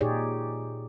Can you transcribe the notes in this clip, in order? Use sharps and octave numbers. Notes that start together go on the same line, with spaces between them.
A#2 D#4 G4 G#4 C#5 D5